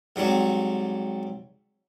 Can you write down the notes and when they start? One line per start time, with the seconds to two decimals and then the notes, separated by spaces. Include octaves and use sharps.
0.16 G#2 F#3 G3 C4